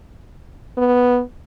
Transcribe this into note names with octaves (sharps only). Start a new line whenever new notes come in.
B3